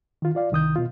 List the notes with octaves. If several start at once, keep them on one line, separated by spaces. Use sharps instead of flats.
D#3 F4
F4 D5 F5
C2 D#3 D#6 G6
B2 F4